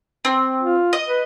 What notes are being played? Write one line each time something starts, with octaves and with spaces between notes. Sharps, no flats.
C4
F4
D#5
B4